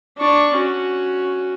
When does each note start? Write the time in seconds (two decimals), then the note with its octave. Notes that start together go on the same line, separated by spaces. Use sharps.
0.18 D4 C#6
0.54 C#4 F#4